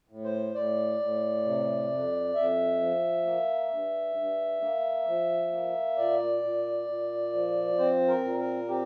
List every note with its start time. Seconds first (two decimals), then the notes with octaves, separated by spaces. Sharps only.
0.09 A2
0.24 C5
0.54 A2 D5
0.99 A2
1.44 C3
1.90 F2
2.34 F2 E5
2.80 F3
3.25 A#3
3.70 G2
4.16 G2
4.61 A#3
5.07 F3
5.52 A#3
5.97 A#2 D5
6.43 A#2
6.87 A#2
7.33 F3
7.78 C4 C5
8.08 A#4
8.23 A#2
8.38 A#4
8.68 C4 G4